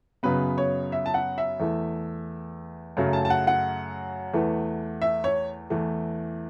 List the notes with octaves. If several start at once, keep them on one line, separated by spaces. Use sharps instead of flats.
F#2 C#3 F#3 B3 B4
C#5
E5
A5
F#5
E5
E2 E3 A3
F#2 C#3 F#3 A3
A5
A5
F#5
F#5
E2 E3 A3
E5
C#5
E2 E3 A3